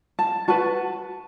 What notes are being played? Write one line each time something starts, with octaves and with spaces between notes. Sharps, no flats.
A5
F#4 B4 A5